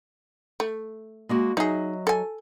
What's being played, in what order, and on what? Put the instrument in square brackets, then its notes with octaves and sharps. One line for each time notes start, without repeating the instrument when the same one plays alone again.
[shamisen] A3
[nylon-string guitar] G#3 A#3 F#4
[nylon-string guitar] F#3 D#5 E5 [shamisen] D#4 G#4
[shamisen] A4 G#5